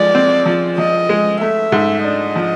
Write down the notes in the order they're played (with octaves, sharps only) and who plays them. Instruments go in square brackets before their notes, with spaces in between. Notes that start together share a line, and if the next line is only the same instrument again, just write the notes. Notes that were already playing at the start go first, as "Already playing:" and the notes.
Already playing: [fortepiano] F3 G#3 [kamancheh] D5
[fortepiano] C4
F3
[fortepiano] F3 [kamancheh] D#5
[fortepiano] G#3
[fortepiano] A3 [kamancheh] E5
[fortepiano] G#2
[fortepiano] D4 [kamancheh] D#5
[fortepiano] F3